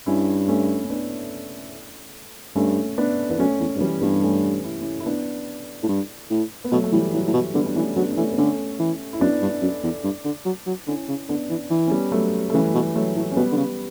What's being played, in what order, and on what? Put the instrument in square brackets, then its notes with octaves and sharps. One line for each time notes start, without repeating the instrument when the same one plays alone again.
[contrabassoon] G2 [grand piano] C#4 E4
[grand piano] A3 C#4
C#4
B3 D4
[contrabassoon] G2 [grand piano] A3 C#4
[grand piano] B3 D4
[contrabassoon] E2 [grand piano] B3
[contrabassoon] F#2 [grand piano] A3 C#4
[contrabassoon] E2
G2
[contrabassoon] F#2 [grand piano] E3 G3
[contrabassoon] G2 [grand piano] G3 B3
[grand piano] A3 C#4
E4
C#4 E4
E4
B3 D4
[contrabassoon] A2
G2
A2
[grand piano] B3
[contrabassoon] B2 [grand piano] F#3 A3
[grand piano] A3
[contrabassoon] A2 [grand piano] E3 G3
[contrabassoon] A2 [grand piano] F#3
[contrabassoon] A2
[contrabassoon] B2 [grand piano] F#3
[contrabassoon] D3 [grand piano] G3 B3
[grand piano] D4
[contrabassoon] E3 [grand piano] A3 C#4
[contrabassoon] F#3 [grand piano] B3 D4
[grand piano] D4
[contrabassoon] E3 [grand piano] A3 C#4
[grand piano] B3
[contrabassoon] D3 [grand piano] A3 C#4
[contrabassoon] E3
[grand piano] E4
[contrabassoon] F#2 [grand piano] B3 D4
[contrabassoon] G2
F#2
E2
G2
D3
F#3
F#3
[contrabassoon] D3 [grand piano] C#4 E4
[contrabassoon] C#3
[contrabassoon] D3 [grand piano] B3 D4
[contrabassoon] E3
E3
[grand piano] C#4
G3 B3
F#3 A3
A3
[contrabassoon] C#3 [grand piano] E3 G3
[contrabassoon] B2
[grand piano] F#3 A3
[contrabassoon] A2
[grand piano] C#4
[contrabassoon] B2 [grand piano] G3 B3
[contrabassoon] D3
C#3